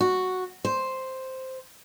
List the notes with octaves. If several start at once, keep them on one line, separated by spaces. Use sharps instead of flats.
F#4
C5